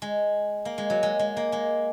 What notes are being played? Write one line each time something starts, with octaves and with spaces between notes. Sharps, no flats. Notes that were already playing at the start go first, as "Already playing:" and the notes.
G#3
A#3
G#3
F#3
G#3
G#3
A#3
G#3